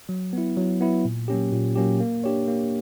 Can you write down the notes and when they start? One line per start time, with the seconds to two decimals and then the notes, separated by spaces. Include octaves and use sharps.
0.09 F#3
0.33 B3 E4
0.57 F#3
0.81 B3 E4
1.05 A#2
1.28 F#3 A#3 C#4 G4
1.52 A#2
1.75 F#3 A#3 C#4 G4
2.00 A#3
2.24 D4 G4 C#5
2.48 A#3